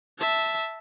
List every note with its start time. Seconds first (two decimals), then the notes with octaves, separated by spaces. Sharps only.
0.19 E5 A5